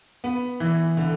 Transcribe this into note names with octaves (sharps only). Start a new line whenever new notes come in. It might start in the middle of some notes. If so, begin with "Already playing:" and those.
B3
E3
D3